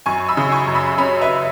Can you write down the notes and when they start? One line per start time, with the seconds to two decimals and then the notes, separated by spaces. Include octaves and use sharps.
0.06 F#2 G#5 C#6
0.29 B5 E6
0.37 C#3
0.51 G#5 C#6
0.67 F#2
0.75 B5 E6
0.98 C#4 B5 E6
1.21 B4 E5